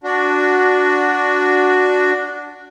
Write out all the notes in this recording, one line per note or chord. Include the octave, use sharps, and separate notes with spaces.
D4 F#4